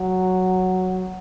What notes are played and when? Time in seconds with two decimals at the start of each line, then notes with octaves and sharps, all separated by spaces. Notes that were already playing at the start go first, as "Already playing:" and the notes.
Already playing: F#3